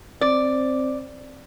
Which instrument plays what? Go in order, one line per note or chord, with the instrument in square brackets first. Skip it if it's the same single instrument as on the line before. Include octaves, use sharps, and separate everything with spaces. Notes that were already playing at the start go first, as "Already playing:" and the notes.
[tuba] C4 [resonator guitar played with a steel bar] D5